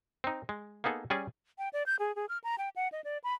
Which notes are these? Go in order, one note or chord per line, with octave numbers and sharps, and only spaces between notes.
C4 D#4
G#3
A#3 B3 D#4 G#4 A4
G3 C#4 G#4 D5 G#5
G5
D5
G6
G#4
G#4
F6
A#5
G5
F#5
D#5
D5
B5